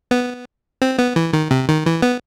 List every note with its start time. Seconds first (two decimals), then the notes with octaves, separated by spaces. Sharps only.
0.11 B3
0.82 C4
0.98 B3
1.16 E3
1.33 D#3
1.51 C3
1.69 D#3
1.86 E3
2.02 B3